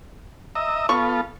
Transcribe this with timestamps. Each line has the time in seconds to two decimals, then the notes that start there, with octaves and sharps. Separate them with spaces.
0.55 D#5 E5 A#5
0.89 B3 F4 A4 C#6